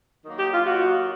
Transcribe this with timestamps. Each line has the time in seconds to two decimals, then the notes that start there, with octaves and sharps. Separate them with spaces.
0.25 D#3 F#3 A#3
0.38 G4
0.52 F4
0.65 D#3 F#3 A#3 F#4